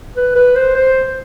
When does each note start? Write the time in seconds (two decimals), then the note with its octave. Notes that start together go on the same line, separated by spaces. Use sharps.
0.16 B4
0.36 B4
0.56 C5
0.75 C5